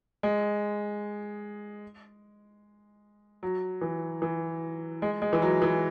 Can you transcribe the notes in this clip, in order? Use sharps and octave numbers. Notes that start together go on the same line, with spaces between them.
G#3
F#3
E3
E3
G#3
G#3
E3
F#3
E3